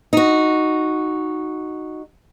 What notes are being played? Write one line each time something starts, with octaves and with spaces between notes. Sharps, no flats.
D#4 F#4